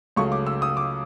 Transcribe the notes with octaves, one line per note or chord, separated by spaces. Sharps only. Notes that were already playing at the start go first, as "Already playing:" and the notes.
C#2 C#3 F#3 A3 C#6
D6
E6
D#6
D6